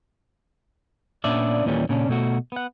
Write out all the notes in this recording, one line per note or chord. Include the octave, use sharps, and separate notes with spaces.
A#2 B3 C#4 D4 D5 E5
D#2 A#2 E3 G3 C#4
A#2 C#3 C#4 D4
B2 A3 F#4
B3 F#5